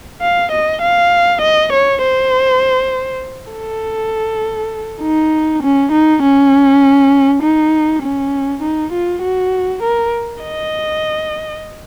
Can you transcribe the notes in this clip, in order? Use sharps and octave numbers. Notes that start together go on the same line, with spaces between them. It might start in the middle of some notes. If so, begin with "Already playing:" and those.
F5
D#5
F5
D#5
C#5
C5
A4
D#4
C#4
D#4
C#4
D#4
C#4
D#4
F4
F#4
A#4
D#5